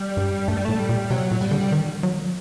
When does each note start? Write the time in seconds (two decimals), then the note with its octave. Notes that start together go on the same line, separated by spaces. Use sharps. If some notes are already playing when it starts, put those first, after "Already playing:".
Already playing: G3
0.17 G2
0.48 G2 A3
0.57 G3
0.65 A2 A3
0.79 G3
0.89 A#2
1.10 C3 F#3
1.31 A#2
1.41 G3
1.51 D3
1.72 D#3
2.03 F#3